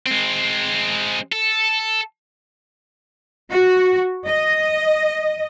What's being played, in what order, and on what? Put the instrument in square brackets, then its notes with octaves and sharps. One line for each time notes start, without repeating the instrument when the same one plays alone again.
[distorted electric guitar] G#3 C4
A4
[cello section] F#4
D#5